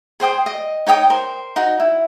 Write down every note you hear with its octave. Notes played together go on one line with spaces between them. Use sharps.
G#4 C5 G5 D#6
D#5
D#4 C#5 G5 D#6
A#4 C5
D#4 F#4
E4